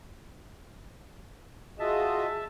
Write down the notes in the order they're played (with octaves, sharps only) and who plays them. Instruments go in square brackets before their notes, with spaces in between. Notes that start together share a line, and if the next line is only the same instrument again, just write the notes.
[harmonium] F4 F#4 D#5 [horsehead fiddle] G#4 [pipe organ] E5 A5